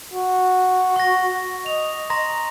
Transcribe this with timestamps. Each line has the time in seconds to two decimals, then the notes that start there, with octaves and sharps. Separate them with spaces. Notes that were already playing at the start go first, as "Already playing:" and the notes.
0.14 F#4
0.96 C#6 A#6
1.66 D#5 F7
2.10 A#5 C6 A#6